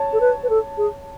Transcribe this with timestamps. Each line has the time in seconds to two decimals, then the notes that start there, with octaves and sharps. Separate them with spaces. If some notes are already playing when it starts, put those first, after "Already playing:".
Already playing: C#5 A5
0.13 A4
0.21 B4
0.43 B4
0.50 A4
0.77 G#4